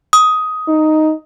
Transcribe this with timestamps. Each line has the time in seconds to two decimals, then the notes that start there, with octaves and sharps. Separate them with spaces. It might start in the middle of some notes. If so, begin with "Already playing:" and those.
0.13 D#6
0.68 D#4